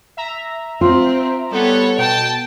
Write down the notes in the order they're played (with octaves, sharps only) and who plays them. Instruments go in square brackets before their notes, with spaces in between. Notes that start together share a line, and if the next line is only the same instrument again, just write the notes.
[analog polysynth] E5 A#5
[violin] C4 [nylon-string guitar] F4
[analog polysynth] G3 B3 [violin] A4 C#5
[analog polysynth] B2 [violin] G5 A5